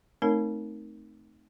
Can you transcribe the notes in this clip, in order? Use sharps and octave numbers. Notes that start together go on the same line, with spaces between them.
A3 C4 D#4 A#4 C#5